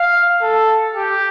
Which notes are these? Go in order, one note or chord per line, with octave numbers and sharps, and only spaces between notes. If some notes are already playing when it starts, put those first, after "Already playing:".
Already playing: F5
A4
G4